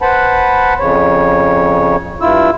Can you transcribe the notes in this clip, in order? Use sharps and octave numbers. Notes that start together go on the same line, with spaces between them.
B4 C5 F#5 A5 B5
F2 C#3 C#5
G2 E4 F4 E6